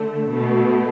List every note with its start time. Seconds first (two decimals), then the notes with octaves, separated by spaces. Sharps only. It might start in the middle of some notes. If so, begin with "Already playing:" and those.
Already playing: D3 A3
0.30 B2 A3